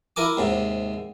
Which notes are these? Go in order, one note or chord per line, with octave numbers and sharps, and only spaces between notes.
E4 A#4 G#5 D6
D#2 G#2 C3